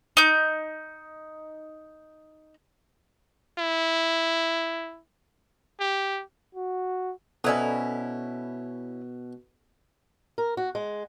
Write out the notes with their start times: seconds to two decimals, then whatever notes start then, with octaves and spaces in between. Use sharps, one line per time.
0.17 D#4 G6
3.58 E4
5.80 G4
6.55 F#4
7.44 B2 C#4 E4 A4 C5 D5 A#5
10.38 A#4
10.57 F#4
10.75 G#3